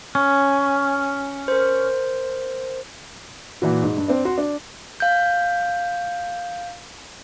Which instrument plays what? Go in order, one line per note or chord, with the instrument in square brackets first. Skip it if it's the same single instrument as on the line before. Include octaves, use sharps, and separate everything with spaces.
[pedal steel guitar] C#4
[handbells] A#4 C5
[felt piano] A#2 E3 F#4
G#2
G2
C4 D4
F#4 C6
D4
[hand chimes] F5 G6